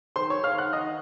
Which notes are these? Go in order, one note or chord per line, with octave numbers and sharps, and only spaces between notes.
D#3 C5 C6
C#5 C#6
D#3
F5 F6
D#3 F#5 F#6
D#3 D#5 D#6